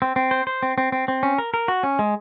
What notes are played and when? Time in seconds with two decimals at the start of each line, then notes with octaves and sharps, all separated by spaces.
0.02 C4
0.16 C4
0.31 C5
0.47 C5
0.63 C4
0.78 C4
0.92 C4
1.08 C4
1.23 C#4
1.38 A#4
1.54 A#4
1.68 F#4
1.83 C#4
1.99 G#3